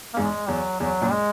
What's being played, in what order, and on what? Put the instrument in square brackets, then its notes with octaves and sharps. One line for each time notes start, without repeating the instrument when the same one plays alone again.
[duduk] A#3
[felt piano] E2 G#2 [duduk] G#3
[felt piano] E2 [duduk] F#3
[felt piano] E2 [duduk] F#3
[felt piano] F#2 A#2
[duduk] G#3